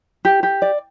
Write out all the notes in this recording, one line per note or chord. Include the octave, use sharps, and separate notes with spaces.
G4
G4
D5